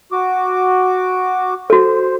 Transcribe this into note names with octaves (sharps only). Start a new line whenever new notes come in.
F#4 D6
F#4 A4 C5